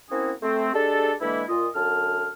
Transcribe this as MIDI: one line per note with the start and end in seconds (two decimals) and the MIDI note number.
0.10 0.31 58
0.10 0.31 60
0.10 0.31 61
0.10 0.31 64
0.10 0.31 66
0.10 0.31 68
0.42 0.70 57
0.42 0.70 60
0.74 1.13 56
0.74 1.13 62
0.74 1.13 67
0.74 1.13 69
1.21 1.42 50
1.21 1.42 52
1.21 1.42 56
1.21 1.42 58
1.21 1.42 64
1.48 1.68 46
1.48 1.68 65
1.48 1.68 75
1.74 2.28 42
1.74 2.28 50
1.74 2.28 81
1.74 2.28 89